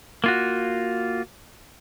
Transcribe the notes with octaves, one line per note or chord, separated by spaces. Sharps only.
A#3 F4 F#4